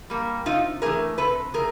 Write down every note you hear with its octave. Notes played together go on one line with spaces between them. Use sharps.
G3 A#3
C3 D#4 F4
E3 A3 G#4 A#4
C3 A4 B4
A3 G#4 A#4